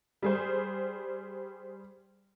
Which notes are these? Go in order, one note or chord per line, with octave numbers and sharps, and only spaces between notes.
G3 G#4 C5